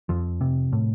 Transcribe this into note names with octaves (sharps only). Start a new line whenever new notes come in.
F2 F3
C3
A2